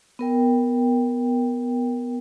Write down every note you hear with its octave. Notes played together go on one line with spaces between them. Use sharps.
B3 A#4 G5